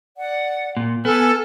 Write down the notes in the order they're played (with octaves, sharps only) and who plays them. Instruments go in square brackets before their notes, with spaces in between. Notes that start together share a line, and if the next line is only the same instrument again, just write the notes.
[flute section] D5 F#5
[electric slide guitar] A#2
[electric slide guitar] B3 [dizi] A4 [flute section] G#5 E6 F6